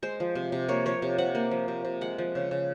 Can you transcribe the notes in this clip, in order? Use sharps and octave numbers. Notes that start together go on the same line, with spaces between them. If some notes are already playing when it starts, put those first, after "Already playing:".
G#3 C5
F3
C3
C3
A#3 C#5
F3 C#5
C3
C3 F#5
A#3
F3
C3
C3
G#3 F#5
F3
C#3
C#3